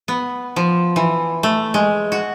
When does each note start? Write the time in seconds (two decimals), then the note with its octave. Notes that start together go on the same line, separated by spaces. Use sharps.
0.08 B3
0.56 F3
0.96 E3
1.43 A3
1.74 G#3
2.12 F#4